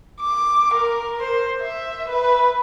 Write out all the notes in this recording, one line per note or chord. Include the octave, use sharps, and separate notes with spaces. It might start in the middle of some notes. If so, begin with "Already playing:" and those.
D6
A#4
C5
E5
B4